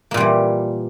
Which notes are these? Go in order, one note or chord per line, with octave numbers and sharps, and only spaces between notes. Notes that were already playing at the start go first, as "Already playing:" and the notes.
A#2 E3 G3 A#3